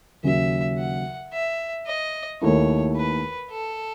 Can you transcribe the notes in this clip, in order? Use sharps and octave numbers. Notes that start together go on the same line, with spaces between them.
D#2 C#3 F#3 C#4 F#4 E5
F#5
E5
D#5
D#2 D#3 A3 E4 C#5
B4
A4